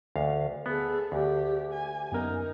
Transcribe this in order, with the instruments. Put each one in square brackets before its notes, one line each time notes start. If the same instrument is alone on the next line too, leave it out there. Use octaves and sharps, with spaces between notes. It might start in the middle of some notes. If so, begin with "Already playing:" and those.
[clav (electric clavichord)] D2 F5
[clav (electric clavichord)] B3 [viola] G#4 A4
[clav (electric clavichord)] D2 [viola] G4
[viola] G#5
[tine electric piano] F#2 B3 A#4 [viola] D#4